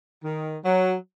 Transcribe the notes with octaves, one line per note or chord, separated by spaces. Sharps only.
D#3
F#3